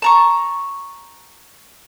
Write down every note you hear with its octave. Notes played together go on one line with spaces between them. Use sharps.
A5 A#5 C#6